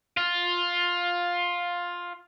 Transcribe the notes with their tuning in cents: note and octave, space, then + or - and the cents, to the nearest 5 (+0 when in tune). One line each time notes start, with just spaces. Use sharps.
F4 +10